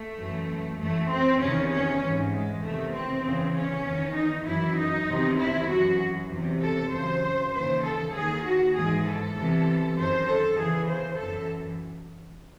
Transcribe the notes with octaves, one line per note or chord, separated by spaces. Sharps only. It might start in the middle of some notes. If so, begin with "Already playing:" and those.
Already playing: A3
F#2 E3
F#2 E3 A3
C4
E2 C3 D#3 C#4
C#4
G#2 E3
G#3
E2 C3 D#3 A3
C4
E2 C#3 E3
C#4
E2 D#3
D#4
F#2 E3 E4
D#4
E2 C3 D#3
E4
F#2 E3 F#4
E2 C3 E3
A4
F#2 C#3 E3 C5
D#2 C#3 E3 C5
A4
D#2 D#3 G#4
F#4
G#2 E3 G#4
A4
E2 C3 E3
F#2 D#3 C5
A4
E2 C#3 E3 G#4
C5
F#2 E3 A4